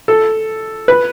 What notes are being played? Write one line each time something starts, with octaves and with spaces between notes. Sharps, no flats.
A4
B4